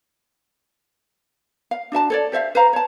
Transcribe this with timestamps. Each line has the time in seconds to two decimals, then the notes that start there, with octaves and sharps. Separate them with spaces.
1.71 F5
1.92 D4 F#4 E5 A5
2.10 A4 C#5 D5
2.32 G4 C5 E5 F5
2.55 B4 C5 F5 A#5
2.73 C#5 A5